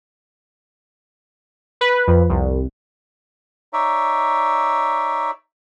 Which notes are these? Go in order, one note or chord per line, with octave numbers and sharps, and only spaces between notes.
B4
F2
C2
D#4 C#5 D5 E5